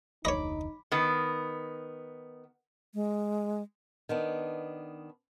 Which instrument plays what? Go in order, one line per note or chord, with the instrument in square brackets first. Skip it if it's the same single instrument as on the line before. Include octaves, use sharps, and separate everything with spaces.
[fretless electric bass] F1 D2 [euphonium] D#4 [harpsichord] C#5 D#5 [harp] B5 D6
[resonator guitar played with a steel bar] D#3 B3
[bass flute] G#3
[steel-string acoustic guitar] D#3 B3 D4